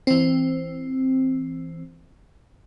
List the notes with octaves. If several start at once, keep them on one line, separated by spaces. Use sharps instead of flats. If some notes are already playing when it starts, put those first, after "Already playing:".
E3 C4